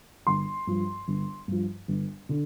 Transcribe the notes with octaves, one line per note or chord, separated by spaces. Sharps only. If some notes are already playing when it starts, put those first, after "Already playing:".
G1 C6
G2 F3
G1
G2 F3
G1
D3